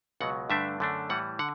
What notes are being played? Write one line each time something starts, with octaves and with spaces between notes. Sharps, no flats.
C#2 B2 F#3 F#5
G2 D3 A3 D4 E5
F#2 D3 A3 D4
A2 E3 G3 F#5
D3 F#5